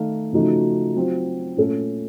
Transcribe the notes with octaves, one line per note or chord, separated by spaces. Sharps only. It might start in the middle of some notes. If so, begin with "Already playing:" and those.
Already playing: D#3 A3 D#4 F5
C#3 F3 A3 D#4 F#4
F#3 C4 F4
A#2 A3 C#4 A4